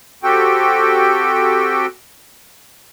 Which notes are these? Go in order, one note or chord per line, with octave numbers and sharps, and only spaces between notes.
C4 F#4 G4 A4 G5